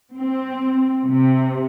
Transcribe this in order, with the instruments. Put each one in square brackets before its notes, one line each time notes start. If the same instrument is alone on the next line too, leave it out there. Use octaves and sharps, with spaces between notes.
[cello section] C4
C3